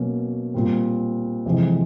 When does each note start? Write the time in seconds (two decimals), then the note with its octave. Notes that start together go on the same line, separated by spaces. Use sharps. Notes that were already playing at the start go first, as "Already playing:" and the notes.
Already playing: B2 F#3 A#3 C#4
0.54 A#2 G3 C4
1.46 F2 C3 E3 G#3